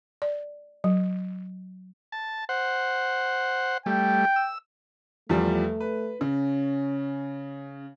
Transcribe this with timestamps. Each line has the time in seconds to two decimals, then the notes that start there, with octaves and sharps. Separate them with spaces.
0.22 D5
0.84 F#3
2.12 A5
2.49 C5 F#5
3.86 G3 A3 G5
4.36 E6
5.29 E2 F3 G3 A3
5.80 B4
6.21 C#3 C#4